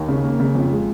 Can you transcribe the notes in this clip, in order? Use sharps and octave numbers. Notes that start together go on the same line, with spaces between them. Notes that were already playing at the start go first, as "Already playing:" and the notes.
Already playing: D#2
C#3
A#3
C#3
F2
G#3